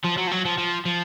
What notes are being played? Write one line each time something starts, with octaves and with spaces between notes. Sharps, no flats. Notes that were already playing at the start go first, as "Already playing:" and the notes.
F3
F#3
F3
F#3
F3
F3
F3